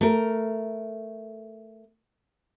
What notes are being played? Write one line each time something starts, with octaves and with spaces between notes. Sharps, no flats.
A3 A#4